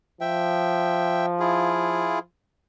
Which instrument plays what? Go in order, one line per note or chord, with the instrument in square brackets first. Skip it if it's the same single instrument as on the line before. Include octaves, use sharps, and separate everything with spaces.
[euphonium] F3 [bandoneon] E5 G5
[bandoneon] E4 F4 G#4